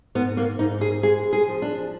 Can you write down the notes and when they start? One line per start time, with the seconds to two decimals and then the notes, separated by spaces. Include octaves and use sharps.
0.15 G#2 B3
0.37 A#3
0.59 G#2 D#4
0.81 G#4
1.03 G#3 G#4
1.33 G#4
1.47 F3
1.62 D4